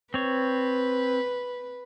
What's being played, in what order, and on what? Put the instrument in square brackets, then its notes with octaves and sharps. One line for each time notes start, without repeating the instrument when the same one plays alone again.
[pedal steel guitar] C4 C#5 [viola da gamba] B4